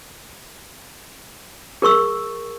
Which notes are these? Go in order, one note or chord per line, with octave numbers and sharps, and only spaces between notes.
G#4 A#4 C#6 E6